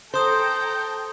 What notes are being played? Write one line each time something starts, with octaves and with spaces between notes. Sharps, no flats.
A4 C5 G5 A#5 C6 D#6 G6